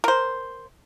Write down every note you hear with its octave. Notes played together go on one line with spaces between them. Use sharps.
A#4 C5